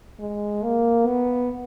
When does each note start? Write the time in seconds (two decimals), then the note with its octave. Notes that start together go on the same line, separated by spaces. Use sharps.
0.20 G#3
0.63 A#3
1.07 B3